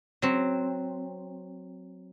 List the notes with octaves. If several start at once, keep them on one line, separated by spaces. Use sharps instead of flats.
F#3 C4